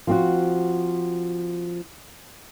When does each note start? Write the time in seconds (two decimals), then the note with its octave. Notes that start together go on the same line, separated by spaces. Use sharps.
0.07 F3 C4 F#4